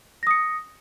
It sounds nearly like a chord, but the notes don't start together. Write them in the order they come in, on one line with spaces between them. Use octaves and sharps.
A#6 D#6 C#7